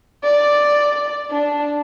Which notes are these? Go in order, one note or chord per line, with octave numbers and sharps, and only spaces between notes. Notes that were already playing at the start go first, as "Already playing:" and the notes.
D5
D4